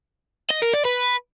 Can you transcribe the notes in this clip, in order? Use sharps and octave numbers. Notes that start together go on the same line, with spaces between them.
D#5
A#4
D5
B4